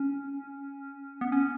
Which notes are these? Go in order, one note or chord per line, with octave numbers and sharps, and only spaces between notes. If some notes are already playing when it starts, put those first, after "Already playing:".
Already playing: C#4
B3
C#4